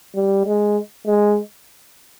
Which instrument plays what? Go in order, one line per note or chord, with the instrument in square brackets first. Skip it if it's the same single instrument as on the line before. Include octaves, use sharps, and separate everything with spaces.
[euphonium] G3
G#3
G#3